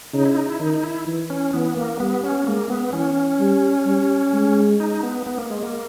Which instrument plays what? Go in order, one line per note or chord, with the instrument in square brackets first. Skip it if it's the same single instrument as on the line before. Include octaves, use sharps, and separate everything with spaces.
[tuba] C#3 [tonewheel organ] D#4
[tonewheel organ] E4
D#4
E4
[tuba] D#3 [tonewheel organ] D#4
[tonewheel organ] D#4
E4
[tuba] E3
[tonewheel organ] C#4
[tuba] E3 [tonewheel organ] B3
[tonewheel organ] A#3
[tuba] G3 [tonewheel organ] B3
[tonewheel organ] C#4
[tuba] G#3 [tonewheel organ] A#3
[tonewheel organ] B3
[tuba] E3 [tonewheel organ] C#4
[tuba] G3
G3
G#3
[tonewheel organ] D#4
B3
B3
A#3
G#3
A#3